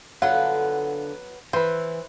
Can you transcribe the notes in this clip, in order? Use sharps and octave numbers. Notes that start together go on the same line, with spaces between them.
D3 F#3 B3 F4 F#5
E3 B4 C5